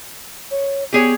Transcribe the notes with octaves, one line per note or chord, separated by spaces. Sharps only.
C#5
B3 G4 G#4 C#5